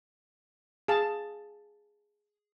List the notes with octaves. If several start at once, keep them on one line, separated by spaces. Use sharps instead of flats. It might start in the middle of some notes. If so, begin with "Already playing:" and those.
G#4 F5 A5